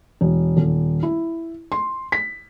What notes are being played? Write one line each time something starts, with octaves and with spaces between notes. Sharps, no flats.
E1
D#1
E4
C6
B6